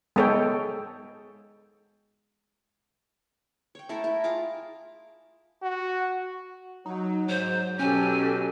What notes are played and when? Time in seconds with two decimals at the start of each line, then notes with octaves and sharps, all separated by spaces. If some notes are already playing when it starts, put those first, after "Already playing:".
0.16 G#3 B3 A4 C#5 G5
3.75 C#5 G5
3.89 A3 E4 A4 A#4
4.04 E4 A#4
4.24 F4 G#4 A#5 D6
5.63 F#4
6.86 F#3 D#4
7.29 G#2 F#3 C5
7.79 B2 F#3 C#4 G4 A4 G#5